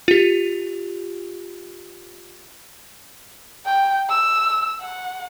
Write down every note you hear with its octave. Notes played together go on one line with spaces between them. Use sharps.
F4 G4
G5
E6
F#5